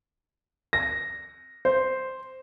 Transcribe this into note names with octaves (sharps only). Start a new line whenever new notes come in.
A#6
C5